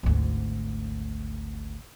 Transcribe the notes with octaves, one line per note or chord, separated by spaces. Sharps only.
G#1 D2